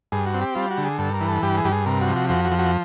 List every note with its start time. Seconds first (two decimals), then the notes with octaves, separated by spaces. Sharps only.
0.12 G2 G#4
0.27 F#4
0.34 C4
0.41 G4
0.55 G3 F4
0.71 F#4
0.78 D3
0.85 G#4
0.99 G2 A4
1.14 A#4
1.21 E3
1.28 A4
1.43 G2 G4
1.57 G#4
1.65 G2 G4
1.72 G#4
1.86 C3 A#4
2.01 F#4
2.08 F3
2.16 F#4
2.30 F2 F#4
2.45 F#4
2.52 F3
2.59 F#4